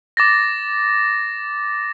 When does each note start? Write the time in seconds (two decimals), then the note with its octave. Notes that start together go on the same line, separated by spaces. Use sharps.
0.17 D6 A6 A#6